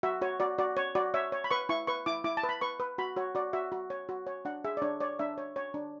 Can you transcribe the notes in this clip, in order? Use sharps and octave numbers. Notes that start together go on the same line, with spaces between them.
F#4 E5
F#4 C#5
F#4 D5
F#4 D5
C#5
F#4 D5
C#5 E5
C#5
B5
B4 C#6
E4 C#6
B4 C#6
E4 D6
E4 D6
A5
B4
B5
B4 C#6
B4
F#4 B5
F#4 C#5
F#4 D5
F#4 E5
F#4
C#5
F#4
C#5
D4 F#5
G#4 E5
D5
D4 C#5
C#5 D5
D4 E5
C#5
C#5
D4